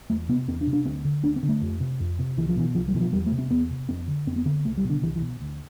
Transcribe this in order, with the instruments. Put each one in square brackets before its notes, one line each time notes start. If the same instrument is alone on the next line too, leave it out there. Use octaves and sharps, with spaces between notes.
[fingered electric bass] E2 A3
C3 B3
E2 C4
D4
C3
D4
D2 C4
D3
D2 D4
C4
D3
A3
F2
C3
F2
C3
C2 E3
F3
B2 E3
C2 F3
G3
B2 E3
F3
E2 G3
A3
C3
C4
E2 B3
C3
F2 C4
D3
F2 C4
B3
D3 C4
C2 A3
G3
B2
D3
C2 E3
E3
B2
D2